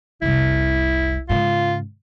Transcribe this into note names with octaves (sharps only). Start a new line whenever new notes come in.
F1 C2 E4
G#2 C#3 F4